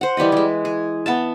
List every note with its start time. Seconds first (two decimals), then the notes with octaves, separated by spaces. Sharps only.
0.01 C5 F#5
0.17 E3 G3 B4 D#5
0.32 E3 G#3
0.65 G#4
1.06 B3 E5 A5